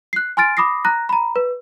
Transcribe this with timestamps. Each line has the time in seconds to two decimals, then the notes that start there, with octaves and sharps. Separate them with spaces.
0.13 F#6 C7
0.37 G#5 C6 F6 A6 D7
0.57 B5 D6 D#6 A#6 C7
0.85 A#5 F#6 A#6
1.09 A#5 B5
1.36 B4